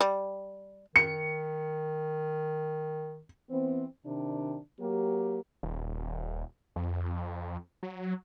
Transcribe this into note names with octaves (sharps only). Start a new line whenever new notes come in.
G3
D#3 C#7
E3 B3 C4
C3 D#3 D4
F#3 A#3 G4
D#1
F2
F#3